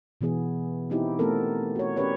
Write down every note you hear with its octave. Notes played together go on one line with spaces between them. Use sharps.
B2 E3 B3 G#4
B3 C4 D#4 E4 G4
A3 B3 C4 A4 A#4
F#4 C#5
C#4 G4 A#4 B4 C#5 D5